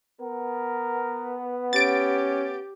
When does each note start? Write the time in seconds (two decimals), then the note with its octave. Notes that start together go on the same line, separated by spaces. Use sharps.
0.21 B3 A#4
1.73 C#4 G4 A6 D7